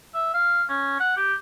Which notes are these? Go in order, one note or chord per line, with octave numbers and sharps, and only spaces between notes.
E5
F5
C#4
F#5
G4